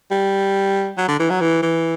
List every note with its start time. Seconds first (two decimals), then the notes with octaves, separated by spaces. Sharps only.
0.11 G3
0.97 F#3
1.08 D3
1.19 E3
1.30 F#3
1.40 E3
1.62 E3